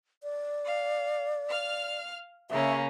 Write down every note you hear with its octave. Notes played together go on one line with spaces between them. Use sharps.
D5
F5
F5 F6
C#3 A#3 C#4 E5